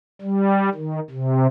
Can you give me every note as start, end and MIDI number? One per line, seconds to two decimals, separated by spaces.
0.21 0.69 55
0.74 1.00 51
1.10 1.47 48